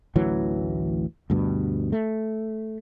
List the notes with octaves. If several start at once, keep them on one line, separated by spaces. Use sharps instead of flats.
A1 D2 E3 F#3
D2 G2 B2
A3